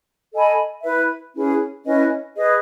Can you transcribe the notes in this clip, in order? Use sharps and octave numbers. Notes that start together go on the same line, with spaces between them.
A4 D#5 G#5 B5
E4 B4 E5
C#4 E4 G#4 B4
C#4 E4 B4 D#5
G#4 B4 D#5